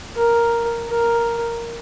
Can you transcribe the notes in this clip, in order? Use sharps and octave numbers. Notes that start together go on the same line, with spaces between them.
A#4
A#4